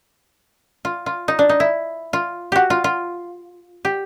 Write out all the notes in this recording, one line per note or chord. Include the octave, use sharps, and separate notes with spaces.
F4
F4
D#4
D4
D#4
E4
F4
F#4 G4
F4
F4
G4